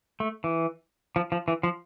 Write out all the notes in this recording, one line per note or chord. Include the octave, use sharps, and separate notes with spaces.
A3
E3
F3
F3
E3
F3